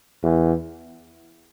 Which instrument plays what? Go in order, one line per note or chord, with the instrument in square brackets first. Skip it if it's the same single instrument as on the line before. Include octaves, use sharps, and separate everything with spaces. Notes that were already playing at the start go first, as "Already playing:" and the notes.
[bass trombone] E2